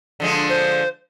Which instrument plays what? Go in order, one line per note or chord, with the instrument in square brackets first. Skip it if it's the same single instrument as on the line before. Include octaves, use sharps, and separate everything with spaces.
[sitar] D3 F3 G#3
[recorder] C5